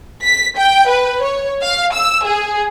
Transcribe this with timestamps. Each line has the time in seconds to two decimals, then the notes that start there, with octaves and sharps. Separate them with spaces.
0.23 B6
0.57 G5
0.89 B4
1.23 C#5
1.62 F5
1.93 E6
2.25 G#4